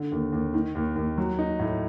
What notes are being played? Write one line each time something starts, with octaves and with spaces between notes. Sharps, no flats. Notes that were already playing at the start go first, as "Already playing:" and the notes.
Already playing: D3
D#2
D#2
D#3
D#2
D#2
F#3
D#4
A2